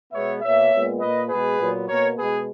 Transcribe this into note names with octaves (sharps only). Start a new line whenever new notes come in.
B2 G#3 B3 C#5 E5
B2 A#3 C#5 E5
A#2 G#3 B3
A#2 A#3 B4 D#5
B2 G#3 B3 G#4 B4
A#2 F#3 B3
B2 A#3 A#4 C#5
B2 G#3 B3 G#4 B4